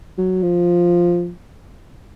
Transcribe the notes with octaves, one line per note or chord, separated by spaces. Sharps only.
F#3
F3